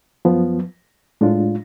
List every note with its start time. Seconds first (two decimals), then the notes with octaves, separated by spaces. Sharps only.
0.25 F#2 F3 B3
1.21 A2 G#3 D4 F4